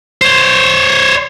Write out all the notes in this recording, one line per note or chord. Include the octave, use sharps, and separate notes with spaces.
C5 C#5